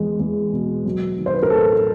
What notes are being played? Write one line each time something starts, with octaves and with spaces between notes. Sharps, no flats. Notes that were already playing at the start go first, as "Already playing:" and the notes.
Already playing: E2 G#3
E2
B2
F#3
D#3
C5
B4
A#4
A1 A4